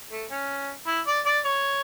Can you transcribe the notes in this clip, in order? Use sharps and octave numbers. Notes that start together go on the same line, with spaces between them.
A3
C#4
E4
D5
D5
C#5